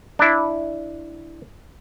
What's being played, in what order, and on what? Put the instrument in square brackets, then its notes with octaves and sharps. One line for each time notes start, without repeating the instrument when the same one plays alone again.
[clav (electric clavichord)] D4 E4